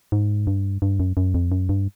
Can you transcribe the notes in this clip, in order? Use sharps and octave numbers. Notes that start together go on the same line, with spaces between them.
G#2
G2
G2
F#2
F#2
F2
F#2
G2